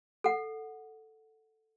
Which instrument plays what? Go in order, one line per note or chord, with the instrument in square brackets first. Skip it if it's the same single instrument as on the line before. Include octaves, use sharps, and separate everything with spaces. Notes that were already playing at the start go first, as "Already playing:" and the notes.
[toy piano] A4 F#5